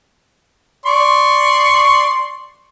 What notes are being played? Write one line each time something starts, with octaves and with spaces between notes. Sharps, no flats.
D5 C6 C#6